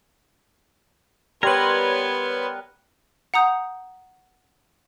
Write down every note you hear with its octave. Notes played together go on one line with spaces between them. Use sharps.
G3 B3 A#4 B4 C#5 C6 G#6
F#5 A#5 D#6 G6